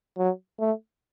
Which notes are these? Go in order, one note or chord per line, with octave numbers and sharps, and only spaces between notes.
F#3
A3